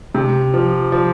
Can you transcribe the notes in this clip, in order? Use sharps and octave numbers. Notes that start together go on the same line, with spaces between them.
C3
F3
F3